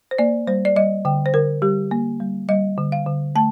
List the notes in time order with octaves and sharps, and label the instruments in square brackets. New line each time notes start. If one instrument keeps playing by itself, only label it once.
[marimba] C5
A#3 D5
G3 C5
D5
G3 D#5
D3 G5
C5
D3 A#4
G3 G4
A#3
G3
G3 D#5
D3
F5
D3
A3 A5